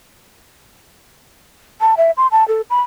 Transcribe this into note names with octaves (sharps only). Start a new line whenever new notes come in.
A5
E5
C6
A5
A4
B5